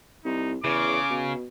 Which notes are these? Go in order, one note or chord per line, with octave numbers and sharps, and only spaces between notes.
C2 D#4
E2 C#3 D6
B2